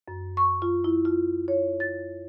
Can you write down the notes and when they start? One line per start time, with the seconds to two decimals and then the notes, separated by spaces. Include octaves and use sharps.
0.08 F#2
0.37 C#6
0.62 F4
0.84 E4
1.05 F4
1.48 C#5
1.80 A6